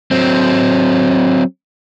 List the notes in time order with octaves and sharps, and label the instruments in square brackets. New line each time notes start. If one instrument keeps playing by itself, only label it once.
[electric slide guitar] F#3 C4